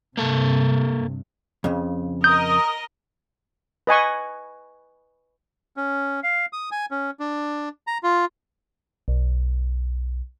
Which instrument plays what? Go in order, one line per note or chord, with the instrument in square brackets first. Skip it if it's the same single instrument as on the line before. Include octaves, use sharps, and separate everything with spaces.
[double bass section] G2 C3 [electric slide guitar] A#3 A4
[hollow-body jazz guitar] F2 C#3
[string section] A#4 D#5 [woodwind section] D#6 [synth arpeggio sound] G6
[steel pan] B4 D#5 G#5 C#6
[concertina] C#4
F5
D#6
G#5
C#4
D4
A#5
F4
[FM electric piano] B1